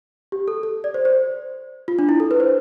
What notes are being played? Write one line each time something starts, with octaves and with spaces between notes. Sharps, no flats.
G4
A4
A4
D5
C5
C5
F4
D4
E4
A4
B4
C5